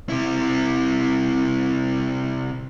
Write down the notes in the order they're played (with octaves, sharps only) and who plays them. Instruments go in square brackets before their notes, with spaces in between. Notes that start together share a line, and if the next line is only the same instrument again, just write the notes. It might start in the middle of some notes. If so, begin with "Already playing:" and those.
[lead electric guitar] C3 E4